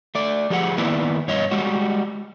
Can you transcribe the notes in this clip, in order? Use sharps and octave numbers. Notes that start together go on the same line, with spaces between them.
A3 D5
F3 G4 G#4 F#5
D#3 A#3 B3 E4 B4 D5
G2 C#5 D#5
G3 G#3 F#4